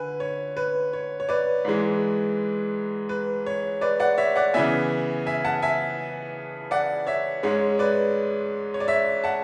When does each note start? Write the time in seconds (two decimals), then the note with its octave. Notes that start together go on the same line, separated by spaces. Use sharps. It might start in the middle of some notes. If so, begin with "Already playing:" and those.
Already playing: D3 B4 G#5
0.20 C#5
0.57 B4
0.93 C#5
1.20 C#5
1.29 B4 D5
1.65 G#2 E3 G#3
3.09 B4
3.46 C#5
3.81 B4 D5
4.00 D5 F#5
4.18 C#5 E5
4.36 D5 F#5
4.54 C#3 E3 B3 E5 G#5
5.27 E5 G#5
5.44 F#5 A5
5.62 E5 G#5
6.71 D5 F#5
7.07 C#5 E5
7.43 G#2 G#3 C#4 C#5
7.79 B4 D5
8.74 C#5
8.80 D5
8.88 C#5 E5
9.24 F#5 A5